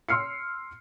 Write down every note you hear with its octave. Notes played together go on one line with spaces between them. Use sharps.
C6 E6 F6 C7 C#7